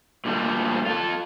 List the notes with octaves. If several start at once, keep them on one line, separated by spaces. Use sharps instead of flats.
A#2 D3 G3 A3
F4 A4